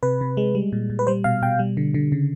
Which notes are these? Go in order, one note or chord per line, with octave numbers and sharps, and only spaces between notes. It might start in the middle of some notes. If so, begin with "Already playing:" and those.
C3 B4
C3
G#3
G3
A#2
A#2
B4
G3 C5
B2 F5
B2 G5
G3
D3
D3
C#3